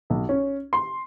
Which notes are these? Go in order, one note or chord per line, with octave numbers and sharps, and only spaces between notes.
B1
C#4
C6